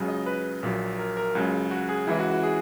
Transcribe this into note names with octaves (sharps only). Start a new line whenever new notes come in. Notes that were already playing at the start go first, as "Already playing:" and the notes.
Already playing: C#2 C#3 F#3
D#5
B4
A#1 A#2 F#3
A#4
A#4
C#2 C#3 F#3
F#4
G#4
C#2 C#3 E3 E4
F#4
F#4
G#4